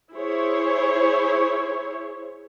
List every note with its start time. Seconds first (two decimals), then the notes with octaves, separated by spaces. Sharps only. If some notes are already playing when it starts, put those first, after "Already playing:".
0.12 E4 G#4 C5 C#5